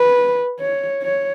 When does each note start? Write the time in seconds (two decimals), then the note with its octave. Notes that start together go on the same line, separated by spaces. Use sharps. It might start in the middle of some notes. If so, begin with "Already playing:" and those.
Already playing: B4
0.60 C#5
1.02 C#5